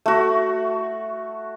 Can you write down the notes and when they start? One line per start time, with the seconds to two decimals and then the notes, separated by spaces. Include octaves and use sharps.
0.06 A3 F#4